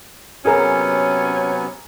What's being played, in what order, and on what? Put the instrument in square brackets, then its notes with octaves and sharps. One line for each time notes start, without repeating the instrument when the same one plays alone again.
[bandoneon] C3 F#3 B3 [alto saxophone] C#4 [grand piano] G#4 A#4